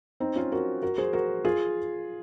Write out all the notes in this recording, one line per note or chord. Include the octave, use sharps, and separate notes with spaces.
C4 D#4
C#4 F4
F#4 A#4
F#4 A#4
G#4 C5
F#4 A#4
F4 G#4